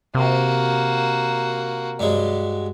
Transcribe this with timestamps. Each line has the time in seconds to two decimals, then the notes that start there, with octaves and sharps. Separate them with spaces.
0.15 C3 A#3 F#4
1.99 G2 F#3 G#3